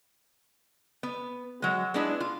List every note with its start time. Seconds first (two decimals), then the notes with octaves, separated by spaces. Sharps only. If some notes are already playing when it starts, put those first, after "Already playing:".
1.03 B3
1.62 F#3 G#3
1.94 G#3 B3 D4 E4 G#4 B4
2.20 F4